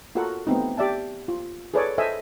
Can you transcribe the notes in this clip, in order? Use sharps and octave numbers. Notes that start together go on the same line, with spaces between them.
F4 F#4 A4 A#4 F#5
A3 B3 C4 D#4
G4 D5 E5 A5
F4
G#4 A4 B4 C#5 D5
A4 C5 D#5 E5 G#5